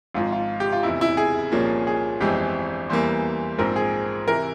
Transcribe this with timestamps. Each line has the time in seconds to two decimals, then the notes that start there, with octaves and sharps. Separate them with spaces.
0.14 G#1 G#2 F3 F4
0.32 F4
0.60 G4
0.72 F4
0.83 F1 E2 C3 E4
1.01 E4
1.17 G#4
1.52 C2 A#2 F3 A#3 C#4
1.87 G#4
2.20 G1 F2 E3 G#3 C4 G4
2.89 E2 E3 G3 A#3 C5
3.58 A#1 G#2 F3 C4 A#4
3.76 G#4
4.28 C3 E3 A#4